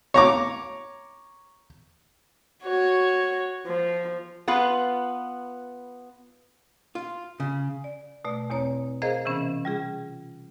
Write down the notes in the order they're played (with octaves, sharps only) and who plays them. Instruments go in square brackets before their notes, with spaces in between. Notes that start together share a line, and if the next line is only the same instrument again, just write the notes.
[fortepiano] C#5 A#5 D6
[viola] F#4 C#5
F3
[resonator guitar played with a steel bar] B3 F4 B4
[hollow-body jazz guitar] F4
C#3
[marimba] D5
B2 A3 D5
E2 B2 C4 C#5 A#5
G#4 A#4 C5 D#5 F5 A#5
C3 E3 B3 C#4
G3 F4 G#4